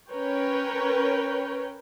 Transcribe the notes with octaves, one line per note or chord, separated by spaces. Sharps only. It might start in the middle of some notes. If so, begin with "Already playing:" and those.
C#4 A#4 B4 C#5 G5